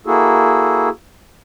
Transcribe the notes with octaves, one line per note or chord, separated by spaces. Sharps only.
A#3 E4 F#4 G#4 A4